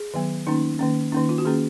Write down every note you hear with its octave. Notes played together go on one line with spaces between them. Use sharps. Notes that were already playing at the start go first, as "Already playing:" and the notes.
Already playing: G#4
D#3 F#3 B3
D#3 A#3 C#4 D#4
D#3 A#3 C#4
D#3 A#3 C#4 D#4
F4
F#4
D#3 A#3 C#4 G#4